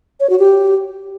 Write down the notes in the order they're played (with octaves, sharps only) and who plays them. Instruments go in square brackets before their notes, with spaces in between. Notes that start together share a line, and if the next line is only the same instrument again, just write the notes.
[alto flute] C#5
F#4
G4